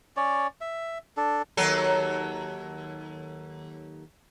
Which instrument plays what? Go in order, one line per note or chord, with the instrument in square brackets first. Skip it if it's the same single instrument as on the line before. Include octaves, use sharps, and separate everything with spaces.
[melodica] C#4 C#5 D5
E5
D4 A4
[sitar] D#2 F#3 A4